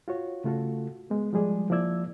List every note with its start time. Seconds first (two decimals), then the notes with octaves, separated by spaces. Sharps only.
0.08 F4 F#4 C#5
0.44 C#3 A3 F4 F#4 A4
1.10 G#3 B3
1.33 F3 G3 G#3 G#4 D5
1.70 F3 A#3 E4 D5 E6 G#6